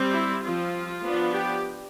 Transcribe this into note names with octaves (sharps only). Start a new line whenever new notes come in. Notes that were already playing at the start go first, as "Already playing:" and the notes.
Already playing: G3 C4
E4
F3 C4 F4
F3 B3 D4
G4